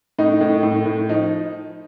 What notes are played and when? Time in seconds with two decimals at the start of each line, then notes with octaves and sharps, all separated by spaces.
0.19 A2 D#4
0.41 A2
0.63 A2
0.86 A2
1.09 F3 D#4